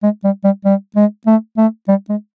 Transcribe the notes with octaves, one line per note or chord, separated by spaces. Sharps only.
G#3
G3
G3
G3
G#3
A3
A3
G3
G#3